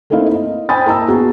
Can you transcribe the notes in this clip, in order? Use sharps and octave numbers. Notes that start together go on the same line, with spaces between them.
A3 A#3 C4 D#4 E4 F5
D#5
C5 G5 G#5 B5 D#6 A6
A#3 E4 A5 A#5 E6
B3 F#4 G#4